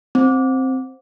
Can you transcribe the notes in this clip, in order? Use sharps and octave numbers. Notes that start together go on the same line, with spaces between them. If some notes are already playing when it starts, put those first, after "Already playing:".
C4